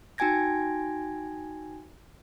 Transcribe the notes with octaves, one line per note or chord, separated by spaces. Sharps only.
D#4 F#4 G5 G#5 G#6 A#6